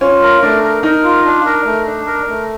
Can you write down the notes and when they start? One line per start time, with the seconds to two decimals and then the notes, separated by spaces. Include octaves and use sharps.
0.01 C#4 F4
0.22 A#4
0.43 A3 D4
0.63 A#4
0.83 D#4 A#4
1.04 F4
1.25 D4
1.46 A#4
1.65 A3
1.86 D4
2.07 A#4
2.28 A3